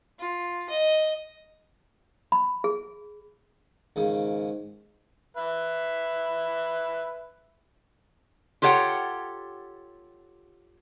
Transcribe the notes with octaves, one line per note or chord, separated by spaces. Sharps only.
F4
D#5
B5
G#4
D#2 G#2 C#3
B4 E5
F4 G4 A4 C#5 F#5 G5